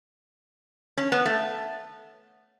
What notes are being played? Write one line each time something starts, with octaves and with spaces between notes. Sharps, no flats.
C#4
B3
A3